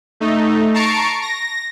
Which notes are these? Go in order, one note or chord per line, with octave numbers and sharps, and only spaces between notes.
A3 D#4
A5 A#5 C#6 C7 D7
A#6